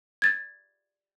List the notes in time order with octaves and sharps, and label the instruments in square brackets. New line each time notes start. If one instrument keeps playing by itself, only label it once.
[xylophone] G#6 A6